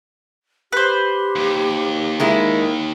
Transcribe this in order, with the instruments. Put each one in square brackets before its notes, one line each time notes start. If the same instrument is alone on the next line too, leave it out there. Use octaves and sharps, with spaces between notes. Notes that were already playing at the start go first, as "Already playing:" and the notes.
[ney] G4 [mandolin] B4 C5
[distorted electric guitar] D#2
[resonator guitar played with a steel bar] D#3 G#3 E4